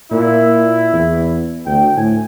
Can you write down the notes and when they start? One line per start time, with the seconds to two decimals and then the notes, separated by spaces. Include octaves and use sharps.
0.11 A#2 E4
0.92 E2
1.66 D2 G5
1.97 A2 G#5